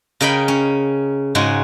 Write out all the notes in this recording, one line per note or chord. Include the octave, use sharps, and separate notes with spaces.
C#3 A#4 D#5 G5 B5
C#4
G#2 C#3 G#3 F#4